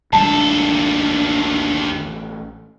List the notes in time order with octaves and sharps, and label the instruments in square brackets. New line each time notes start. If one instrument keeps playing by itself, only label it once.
[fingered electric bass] A1 G3 G#3 [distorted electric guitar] D#2 A4 [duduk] D4 [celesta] A5